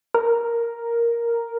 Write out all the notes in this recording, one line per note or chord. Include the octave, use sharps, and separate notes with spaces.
A#4